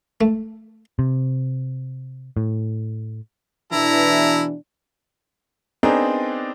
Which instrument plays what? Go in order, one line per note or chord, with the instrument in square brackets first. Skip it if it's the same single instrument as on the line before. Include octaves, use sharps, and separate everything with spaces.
[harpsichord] A3
[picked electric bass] C3
A2
[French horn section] B2 E3 D4 [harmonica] E4 A4 A#5
[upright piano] B3 C4 D4 D#4 G#4 A#4